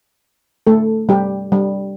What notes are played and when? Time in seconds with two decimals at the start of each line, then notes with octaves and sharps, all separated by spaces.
0.67 A3 A4
1.09 G3 G4
1.52 G3